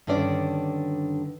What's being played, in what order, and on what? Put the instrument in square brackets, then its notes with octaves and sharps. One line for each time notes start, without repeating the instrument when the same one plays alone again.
[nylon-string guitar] G2 D3 D#3 C#4 D5